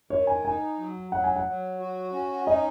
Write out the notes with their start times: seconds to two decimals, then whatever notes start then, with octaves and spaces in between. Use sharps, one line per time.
0.10 D#3 C#5
0.27 G#5
0.45 D#4 G#5
0.79 F#3
1.12 F#3 F#5
1.24 G#5
1.36 F#5
1.46 F#3
1.79 F#4
2.13 C#4
2.47 D#4 D#5